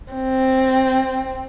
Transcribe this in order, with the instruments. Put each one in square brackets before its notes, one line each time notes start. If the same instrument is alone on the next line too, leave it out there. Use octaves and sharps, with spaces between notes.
[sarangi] C4